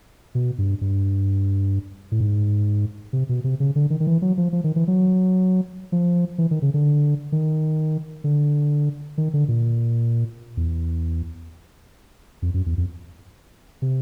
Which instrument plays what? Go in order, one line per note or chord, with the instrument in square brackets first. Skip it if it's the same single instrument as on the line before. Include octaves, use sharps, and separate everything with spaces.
[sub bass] B2
G2
G2
A2
G#2
C3
B2
C3
C#3
D3
D#3
D#3
E3
F#3
F3
F3
D#3
E3
F#3
F3
E3
D#3
C#3
D3
D#3
D3
D#3
D3
A#2
E2
F2
F#2
E2
F2
C3